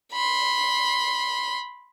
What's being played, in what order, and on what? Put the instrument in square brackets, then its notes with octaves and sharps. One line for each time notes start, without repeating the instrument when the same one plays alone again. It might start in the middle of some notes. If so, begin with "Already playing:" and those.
[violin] B5 C6